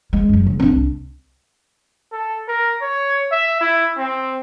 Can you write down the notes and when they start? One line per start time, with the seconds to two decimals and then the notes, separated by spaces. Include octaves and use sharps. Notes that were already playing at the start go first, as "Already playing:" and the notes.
0.13 G#3
0.29 F#2 F#3
0.47 C#3
0.60 C4 D4
0.72 C2
2.12 A4
2.48 A#4
2.82 C#5
3.32 E5
3.61 E4
3.98 C4